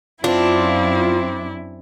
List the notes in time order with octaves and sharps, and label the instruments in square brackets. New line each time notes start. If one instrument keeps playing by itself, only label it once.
[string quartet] F#2 E4 [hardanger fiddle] C4 [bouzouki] D4 [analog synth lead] F4